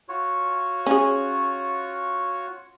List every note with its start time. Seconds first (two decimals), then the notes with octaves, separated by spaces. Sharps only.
0.09 F4 F#4 C#5
0.86 C#4 G#4